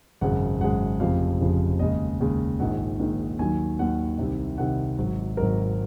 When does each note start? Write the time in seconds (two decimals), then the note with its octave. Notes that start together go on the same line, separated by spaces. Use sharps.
0.21 G#1 F#2 C#3 G#3 F#5
0.60 G#1 F#2 C#3 G#3 F#5
1.00 F1 F2 C#3 F3 F5
1.40 F1 F2 C#3 F3
1.79 D#2 C#3 G#3 D#5
2.20 D#2 C#3 G#3
2.60 A#1 G#2 D#3 F#5
2.99 A#1 G#2 D#3
3.39 D#2 D#3 F#3 G#5
3.79 D#2 D#3 F#3 F#5
4.18 C2 C3 D#3
4.58 C2 C3 D#3 F#5
4.98 G#1 G#2 F#3
5.37 G#1 G#2 F#3 A#4